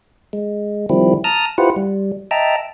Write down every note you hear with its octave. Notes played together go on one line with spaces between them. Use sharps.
G#3
D#3 F3 G3 C4 E4
A5 A#5 D#6 F6
E4 F4 G4 B4 C5 F#5
G3
D#5 E5 G5 A5 A#5